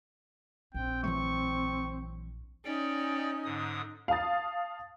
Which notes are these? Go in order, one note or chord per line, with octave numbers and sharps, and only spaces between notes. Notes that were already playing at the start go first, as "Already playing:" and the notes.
A#1 C4 G5
E3 F#3 A3 C#6
C#4 D#4 D5 G5
G#2 D3 D#6
F5 A5 D#6 A6